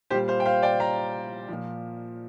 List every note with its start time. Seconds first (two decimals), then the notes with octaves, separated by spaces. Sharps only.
0.10 A#2 G3 G4 C5
0.28 C5 F5
0.40 G5
0.46 C5 F5
0.62 D5 G5
0.80 F5 A#5
1.48 A#2 F3